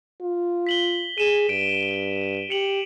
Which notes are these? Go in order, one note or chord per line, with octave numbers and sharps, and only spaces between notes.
F4
B6 F#7 G7
G#4 D#7 E7 G7
G2 D7
G4 C#7 F7 F#7